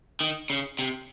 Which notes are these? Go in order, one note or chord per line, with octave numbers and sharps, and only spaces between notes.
D#3
C#3
C3